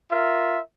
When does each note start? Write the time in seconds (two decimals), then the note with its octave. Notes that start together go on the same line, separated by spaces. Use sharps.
0.10 F4 A#4 E5